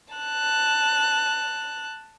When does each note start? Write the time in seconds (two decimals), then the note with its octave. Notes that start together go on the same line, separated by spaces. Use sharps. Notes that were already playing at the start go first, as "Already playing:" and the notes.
0.14 A5 F#6